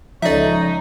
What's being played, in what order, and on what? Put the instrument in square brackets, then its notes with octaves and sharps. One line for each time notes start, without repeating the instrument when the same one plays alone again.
[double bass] C#2 C#4 [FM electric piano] F3 A4 [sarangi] D#4 [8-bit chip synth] D5 E5